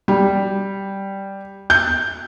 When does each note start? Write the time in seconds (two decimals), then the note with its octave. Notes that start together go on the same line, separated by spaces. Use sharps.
0.08 G3
1.70 G6